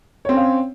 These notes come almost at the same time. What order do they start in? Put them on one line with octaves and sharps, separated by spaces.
C#5 C4 C#4 F5